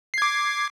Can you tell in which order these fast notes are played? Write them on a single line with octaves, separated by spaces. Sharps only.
C7 G#6 D6